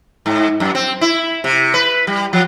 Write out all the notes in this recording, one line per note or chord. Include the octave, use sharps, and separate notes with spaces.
G#2
F#2
C4
E4
C3
B4
G3
F3